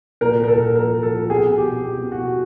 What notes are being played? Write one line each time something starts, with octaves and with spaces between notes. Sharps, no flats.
A#2 A#4
A#2 A#4
A4
A#2
F3 A#4
F3
A4
F3
B2 G#4
B2
G4
B2
B2 G4
B2
F#4
B2